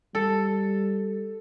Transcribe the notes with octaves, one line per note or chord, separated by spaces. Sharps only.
G3 A4